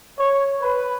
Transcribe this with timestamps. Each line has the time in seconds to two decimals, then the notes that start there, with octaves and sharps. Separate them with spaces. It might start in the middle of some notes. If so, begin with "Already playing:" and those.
0.17 C#5
0.60 B4